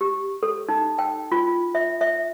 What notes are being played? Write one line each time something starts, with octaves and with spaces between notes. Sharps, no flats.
G4
A4
D#4
G5
F4
E5
E5